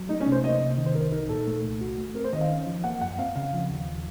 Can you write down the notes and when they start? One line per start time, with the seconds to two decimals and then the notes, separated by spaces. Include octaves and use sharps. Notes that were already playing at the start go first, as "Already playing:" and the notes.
Already playing: F#3
0.09 A3 D#4
0.20 C#4
0.27 C3 C5
0.44 A#3 D#5
0.61 C3
0.78 D#3
0.86 C5
0.95 C2 A#4
1.12 D#4 A#4
1.29 A#2 A4
1.47 A3
1.64 C2
1.81 F#4
1.98 A3
2.15 C4 A#4
2.24 C5
2.33 D#3 D#5
2.41 F5
2.50 C#4
2.67 F3
2.84 A#3 F#5
3.01 F#2 F#5
3.19 C4 F5
3.36 C#3 F5
3.53 F3
3.69 D#2